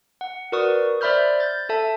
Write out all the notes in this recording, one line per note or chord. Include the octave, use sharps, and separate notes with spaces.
F#5
F#4 A#4 B4 D5 C#6 D#6
C5 D5 E5 B5 F6 G6
G6 A6
A4 E5 A5